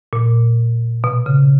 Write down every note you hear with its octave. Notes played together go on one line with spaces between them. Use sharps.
A#2
B2
C#3